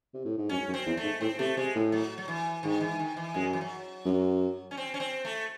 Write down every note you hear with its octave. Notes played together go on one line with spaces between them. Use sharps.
C3
A2
G#2
F#2 C#4
F#2
C4
E2
A3
G#2
A2 C4
C3 A3
C3 G#3
A2
F#3
F#3
E3
G#2 D#3
E3
D#3
E3
F#2 G#3
F#3
E3
F#3
F#2
C#4
C4
C#4
C4
A3